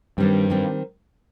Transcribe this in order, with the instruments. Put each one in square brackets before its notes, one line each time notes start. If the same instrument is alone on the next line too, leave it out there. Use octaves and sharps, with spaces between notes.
[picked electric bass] G2 [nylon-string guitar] D#3 G3 C4
[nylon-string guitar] D#3 G3 C4